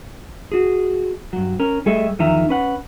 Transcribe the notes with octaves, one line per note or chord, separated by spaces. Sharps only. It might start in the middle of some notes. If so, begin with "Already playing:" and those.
F#4 G#4
G2 F#3
C#4 A#4
G3 A3 G#4 A4 D#5 E5
E2 D#3 F3 D#4 E5 A#5
C#4 B4 F#5